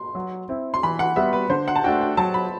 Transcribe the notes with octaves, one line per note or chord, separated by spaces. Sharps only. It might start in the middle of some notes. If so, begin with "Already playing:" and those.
Already playing: C6
F#3
C4 E4
C6
E3 B5
F#5
G3 B3 F#4 E5
B4
D3 C5
F#5
A5
A3 D4 F#4 G5
G5
F#3 A5
B5